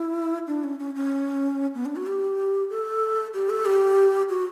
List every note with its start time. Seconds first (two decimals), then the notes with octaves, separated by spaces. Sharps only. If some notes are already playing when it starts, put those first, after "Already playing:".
Already playing: E4
0.47 D4
0.64 C#4
0.79 C#4
0.95 C#4
1.75 B3
1.86 D4
1.96 F#4
2.07 G4
2.70 A4
3.34 G4
3.50 A4
3.65 G4
4.29 F#4